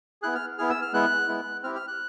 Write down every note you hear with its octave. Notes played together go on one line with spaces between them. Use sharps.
B3 E4 G#4 F#6
F6
B3 E4 G#4 F6
E6
F6
G#3 B3 E4 F#6
G#3 B3 E4
C4 E4 G4 F6
F6
F#6